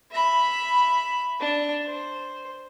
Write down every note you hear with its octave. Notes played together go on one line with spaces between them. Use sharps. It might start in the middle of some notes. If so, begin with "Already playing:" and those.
E5 B5
D4
C5